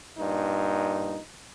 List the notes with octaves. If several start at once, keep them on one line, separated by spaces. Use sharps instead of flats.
G2 A#2 D#4